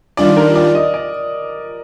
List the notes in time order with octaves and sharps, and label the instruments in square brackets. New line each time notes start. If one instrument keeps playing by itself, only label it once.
[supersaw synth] D#3 G3 D4 F4 [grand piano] D5
[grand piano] A#4
D5
D#5
D5